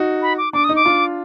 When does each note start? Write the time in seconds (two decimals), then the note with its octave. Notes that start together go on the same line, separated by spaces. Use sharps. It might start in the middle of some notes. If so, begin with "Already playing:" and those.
Already playing: D#4 F#4
0.22 B5
0.38 D6
0.53 D4 D6
0.64 D#4 D#6
0.76 D6
0.85 D4 F4